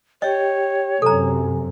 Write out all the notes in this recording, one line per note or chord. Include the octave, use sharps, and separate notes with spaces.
G4 C#5 D#5 G5
F#2 C3 A4 G#5 A#5